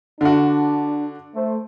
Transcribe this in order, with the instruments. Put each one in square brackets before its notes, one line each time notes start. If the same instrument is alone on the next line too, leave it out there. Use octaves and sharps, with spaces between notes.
[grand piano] D3 F#4 [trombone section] D4
[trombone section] A3 C5